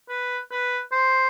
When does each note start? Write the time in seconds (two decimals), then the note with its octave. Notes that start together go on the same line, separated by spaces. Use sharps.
0.09 B4
0.51 B4
0.92 C5